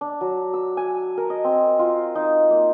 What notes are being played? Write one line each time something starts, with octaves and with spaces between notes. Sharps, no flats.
D4
F#3
E6
G#5
A#4
D#5
C4
F4
D#4
A#3